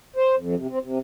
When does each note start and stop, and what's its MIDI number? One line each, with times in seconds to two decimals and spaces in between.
0.16 0.35 72
0.37 0.55 41
0.56 0.67 48
0.71 0.79 60
0.83 0.99 48